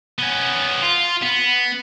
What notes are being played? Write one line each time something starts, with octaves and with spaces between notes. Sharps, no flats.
B3 C#4
F4
B3